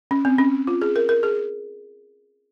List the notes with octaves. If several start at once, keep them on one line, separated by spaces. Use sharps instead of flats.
C#4
C4
C#4
F4
G#4
A#4
A#4
G#4